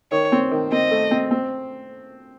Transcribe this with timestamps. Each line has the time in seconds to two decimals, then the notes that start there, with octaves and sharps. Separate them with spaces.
0.11 D#3 C#5
0.32 C4
0.51 D#3
0.72 C4 D#5
0.91 A3
1.11 C4
1.31 C4